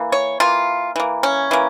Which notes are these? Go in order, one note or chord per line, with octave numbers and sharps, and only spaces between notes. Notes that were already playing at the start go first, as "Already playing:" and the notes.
Already playing: E3 A#3
C#5
E3 A#3 F4
E3 A#3
C#4
E3 A#3